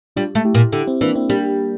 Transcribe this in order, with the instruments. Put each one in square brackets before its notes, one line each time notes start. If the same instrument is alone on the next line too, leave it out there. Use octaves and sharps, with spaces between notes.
[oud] G3 [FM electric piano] D4 F4
[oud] A3
[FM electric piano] E4 G4
[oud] A#2
[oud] D3 [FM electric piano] E4 G4
[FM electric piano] C4 E4
[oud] E3 [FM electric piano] A#3 D4
[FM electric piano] C4 E4
[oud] G3 [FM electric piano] A#3 D4